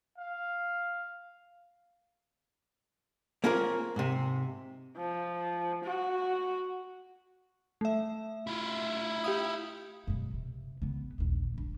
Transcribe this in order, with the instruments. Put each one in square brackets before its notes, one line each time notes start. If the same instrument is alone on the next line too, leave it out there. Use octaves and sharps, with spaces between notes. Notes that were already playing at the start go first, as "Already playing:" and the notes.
[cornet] F5
[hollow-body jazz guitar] A#3 C4 C#4 F4 G#4 A#4
G#2 C3
[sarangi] F3
F#4
[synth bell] A3 E5
[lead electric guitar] E4 F4
[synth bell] G4 F5 D#6
[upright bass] F#2 B2
C3
C#3 B3
A#1 D#2
D#1 D4